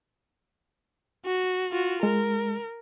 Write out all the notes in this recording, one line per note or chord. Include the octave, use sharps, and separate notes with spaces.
F#4
F4 F#4
G#3 A#4